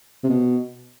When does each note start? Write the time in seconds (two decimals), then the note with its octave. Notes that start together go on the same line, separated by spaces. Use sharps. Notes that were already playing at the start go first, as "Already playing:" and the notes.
0.23 C3
0.29 B2